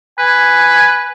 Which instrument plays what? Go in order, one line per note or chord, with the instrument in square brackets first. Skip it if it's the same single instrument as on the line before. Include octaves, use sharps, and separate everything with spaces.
[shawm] B4 [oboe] G#5